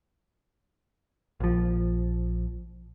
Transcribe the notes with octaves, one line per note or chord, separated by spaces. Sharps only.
A#1 F3